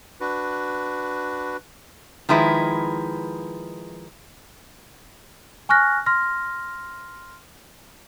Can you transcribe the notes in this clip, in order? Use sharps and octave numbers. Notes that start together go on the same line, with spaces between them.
D4 F#4 B4
D#3 F3 G#3 E4 B4
G#5 C#6 F6 F#6 A#6
C6 F6 A#6